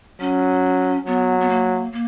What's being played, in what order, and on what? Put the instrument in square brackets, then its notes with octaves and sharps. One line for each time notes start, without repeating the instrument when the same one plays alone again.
[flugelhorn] F#3 [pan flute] C#4
[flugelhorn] F#3 [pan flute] B3
[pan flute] B3
A#3
A#3